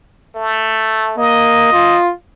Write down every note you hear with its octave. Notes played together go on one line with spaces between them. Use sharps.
A3
A#3 D#5
F4